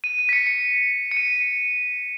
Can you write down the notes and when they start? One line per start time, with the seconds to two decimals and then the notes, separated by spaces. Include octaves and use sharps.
0.04 D#7
0.19 D#7
0.29 B6
0.33 C#7
0.47 C#7
1.11 C#7
1.17 D#7